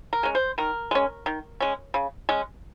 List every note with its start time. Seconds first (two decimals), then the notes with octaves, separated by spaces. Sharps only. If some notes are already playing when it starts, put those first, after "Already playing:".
0.13 A#4
0.23 G#3 C#4
0.35 C5
0.58 D#3 A#4
0.91 G#3 C#4
1.26 D#3
1.60 G#3 C#4
1.94 C#3
2.29 G#3 C#4